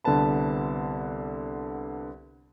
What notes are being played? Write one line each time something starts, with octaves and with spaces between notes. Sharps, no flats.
C2 D3 B3 B4 A5 B5